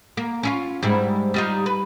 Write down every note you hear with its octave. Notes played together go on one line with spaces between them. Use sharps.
A#3
C#4 E4 F4
G#2 G3 E4
G3 D#4 F4
B4